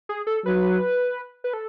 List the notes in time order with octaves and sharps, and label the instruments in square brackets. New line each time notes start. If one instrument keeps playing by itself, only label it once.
[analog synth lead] G#4
A4
[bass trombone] F#3 [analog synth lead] B4
[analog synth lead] B4
A4